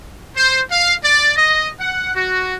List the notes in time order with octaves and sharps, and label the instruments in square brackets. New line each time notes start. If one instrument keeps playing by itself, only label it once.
[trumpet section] C5
F5
D5
D#5
F#5
F#4